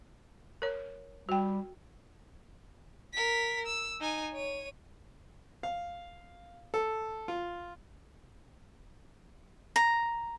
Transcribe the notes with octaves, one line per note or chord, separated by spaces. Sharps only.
A#4 C#5
G3 F#4 G5
A#4 B6
E6
D#4 G#5
C#5 D#7
F5
A4
F4
A#5